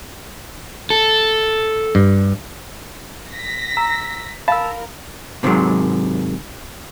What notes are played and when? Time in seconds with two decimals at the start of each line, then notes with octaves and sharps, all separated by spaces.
0.90 A4
1.95 G2
3.30 A#6 B6
3.77 A#5 E6
4.48 A#4 F5 A5 B5 E6
5.43 G#2 C3 D#3 E3 F#3 G#3